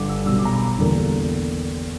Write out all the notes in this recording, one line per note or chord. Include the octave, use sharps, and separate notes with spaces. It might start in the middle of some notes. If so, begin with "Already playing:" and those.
Already playing: G1 G2 D3 F#5 D6
E6
B1 B2 G3 E6
D6
A#5
B5
A#5
E2 D3 G3 A#3